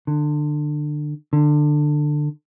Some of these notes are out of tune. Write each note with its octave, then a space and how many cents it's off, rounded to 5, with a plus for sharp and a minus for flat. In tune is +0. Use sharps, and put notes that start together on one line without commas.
D3 +25
D3 +20